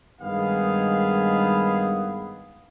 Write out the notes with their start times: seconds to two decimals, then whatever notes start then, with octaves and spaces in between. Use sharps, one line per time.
0.21 G2 D#3 G#3 B3 G#4 F5